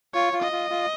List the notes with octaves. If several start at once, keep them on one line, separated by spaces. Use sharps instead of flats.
F4 C#5
F4
D#5
F4
F4